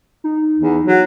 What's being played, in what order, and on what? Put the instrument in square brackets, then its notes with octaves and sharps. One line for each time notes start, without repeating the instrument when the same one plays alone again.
[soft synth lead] D#4
[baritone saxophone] E2
F#3